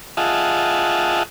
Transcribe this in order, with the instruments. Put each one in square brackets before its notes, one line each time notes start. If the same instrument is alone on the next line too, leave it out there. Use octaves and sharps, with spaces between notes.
[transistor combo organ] F4 G#4 D#5 E5 F#5 A5